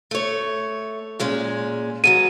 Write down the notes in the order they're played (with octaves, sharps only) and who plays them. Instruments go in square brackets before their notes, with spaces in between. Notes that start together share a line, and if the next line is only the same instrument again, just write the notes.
[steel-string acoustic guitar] A3 C#5
A#2 G#3 C#4
[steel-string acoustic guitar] G#2 F#3 B3 [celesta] D#7